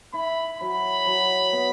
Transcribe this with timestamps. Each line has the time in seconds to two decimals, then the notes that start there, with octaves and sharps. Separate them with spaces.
0.14 E4 B5
0.60 F#3 B5
1.06 F#3
1.53 B3